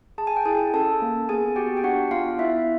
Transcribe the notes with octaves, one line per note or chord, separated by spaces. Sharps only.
G#4 A5
G#5
G5
E4 G#4 G#5
C#4 A4 A5
A#3
B3 G#4 G#5
F#4 G4 G5
G5
D4 F#4 F#5
B3 F4 F5
B3 E4 E5